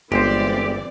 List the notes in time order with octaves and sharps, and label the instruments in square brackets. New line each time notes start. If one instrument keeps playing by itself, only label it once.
[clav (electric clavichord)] G1 C5 [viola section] E3 C4 D5 [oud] G#3 [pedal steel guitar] G4